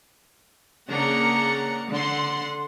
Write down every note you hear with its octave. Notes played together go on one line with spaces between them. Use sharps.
C#3 A#3 D4 F#5 A#5 C#7
D3 F#5 C6